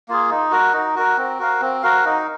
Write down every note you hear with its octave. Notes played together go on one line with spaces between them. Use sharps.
A#3 F4 G#4
D#4
F#4 A#4
D#4
F#4 A#4
C4
F#4 A#4 F5
C4
F#4 A#4 F5
D#4